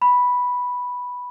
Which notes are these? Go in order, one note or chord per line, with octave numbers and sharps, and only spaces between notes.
B5